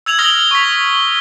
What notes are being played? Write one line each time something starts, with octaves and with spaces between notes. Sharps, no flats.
E6 G#6 F7 F#7
D#6 F6 A#6 F#7 G7
C#6 B6